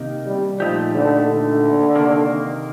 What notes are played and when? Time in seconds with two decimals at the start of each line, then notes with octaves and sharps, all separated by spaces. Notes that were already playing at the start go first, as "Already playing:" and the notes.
Already playing: C3 D#3 A#3 D#4 G4
0.26 G3
0.60 A#2 F3 A3 D#4 G4
0.94 D3
1.27 D3
1.95 C3 D#3 A#3